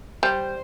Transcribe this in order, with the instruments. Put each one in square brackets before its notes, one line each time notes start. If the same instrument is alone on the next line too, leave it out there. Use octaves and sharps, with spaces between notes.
[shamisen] G3 [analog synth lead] C5